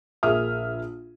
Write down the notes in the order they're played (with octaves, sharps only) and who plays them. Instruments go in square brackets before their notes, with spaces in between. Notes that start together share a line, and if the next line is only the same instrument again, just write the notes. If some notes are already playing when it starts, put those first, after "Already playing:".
[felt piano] A#1 G#4 A#4 E5 D#6 F6